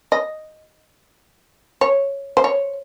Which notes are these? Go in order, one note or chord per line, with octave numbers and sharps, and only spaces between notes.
D#5
C#5
C5
C#5